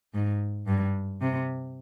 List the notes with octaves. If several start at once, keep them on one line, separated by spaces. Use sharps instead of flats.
G#2
G2
C3